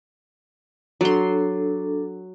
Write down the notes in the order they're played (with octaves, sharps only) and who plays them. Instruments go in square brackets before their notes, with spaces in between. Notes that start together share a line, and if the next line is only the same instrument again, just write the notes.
[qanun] F#3 C6 [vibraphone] D4 A4